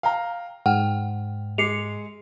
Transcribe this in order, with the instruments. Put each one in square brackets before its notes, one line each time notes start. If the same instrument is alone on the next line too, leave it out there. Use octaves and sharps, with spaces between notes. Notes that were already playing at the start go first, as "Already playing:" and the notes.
[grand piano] F5 G5 A#5
[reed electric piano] G#2 [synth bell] F#5 G5 [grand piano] F6
[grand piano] G#3 D6 [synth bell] C7 C#7 F7